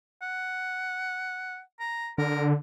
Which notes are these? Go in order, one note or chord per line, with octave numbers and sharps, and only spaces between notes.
F#5
A#5
D3 A#4